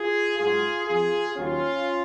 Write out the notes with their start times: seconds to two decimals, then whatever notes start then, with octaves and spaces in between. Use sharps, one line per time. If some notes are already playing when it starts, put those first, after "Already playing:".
Already playing: F4 G#4
0.38 G#2 F#3 F4 G#4
0.87 F2 F3 F4 G#4
1.36 D#2 D#3 F#3 C#4 F4